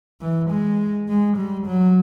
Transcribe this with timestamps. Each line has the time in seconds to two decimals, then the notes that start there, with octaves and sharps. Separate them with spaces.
0.21 E3
0.50 G#3
1.09 G#3
1.37 G3
1.67 F#3